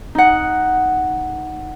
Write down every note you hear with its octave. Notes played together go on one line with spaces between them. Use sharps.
D#4 F#5